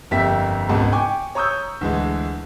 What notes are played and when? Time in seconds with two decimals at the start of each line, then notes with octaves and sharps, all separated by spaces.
0.11 G1 F2 A#3 G4 E5 B6
0.69 G#1 C#2 B2 G#3 F#5 A5
0.92 G5 G#5 C#6 D6
1.35 C#5 A#5 C#6 D#6 E6 G6
1.81 D2 E3 G#3